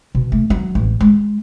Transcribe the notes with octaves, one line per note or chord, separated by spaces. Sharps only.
B2
A3
F#3
A1
G#3